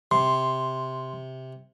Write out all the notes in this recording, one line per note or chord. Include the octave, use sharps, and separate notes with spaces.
C3 C6